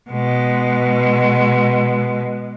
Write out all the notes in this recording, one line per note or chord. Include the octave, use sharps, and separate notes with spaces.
B2 G#3